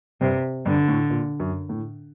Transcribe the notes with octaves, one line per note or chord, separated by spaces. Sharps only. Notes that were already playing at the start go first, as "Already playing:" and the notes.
G2 C3
G2 D3
A2
A#2
F#2
A2